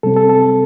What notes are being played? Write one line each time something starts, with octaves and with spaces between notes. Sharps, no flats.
C3 G3 C4 A4
A4
A4